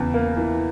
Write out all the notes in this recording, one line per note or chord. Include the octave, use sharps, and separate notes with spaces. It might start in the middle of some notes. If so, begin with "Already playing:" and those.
Already playing: E2 C#3 E3
A#3
E3